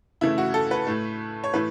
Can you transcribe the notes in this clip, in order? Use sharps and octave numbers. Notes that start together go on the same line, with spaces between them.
C#3 E3 A3 E4
F#4
A4
B4
A2 A3
C#5
A2 E3 A3 B4